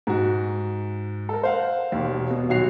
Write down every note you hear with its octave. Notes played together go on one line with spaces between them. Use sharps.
G#2 F#4
A4 A#4
C5 F5 F#5
E1 D#2
B2
D#1 B1 F#4 C7 F7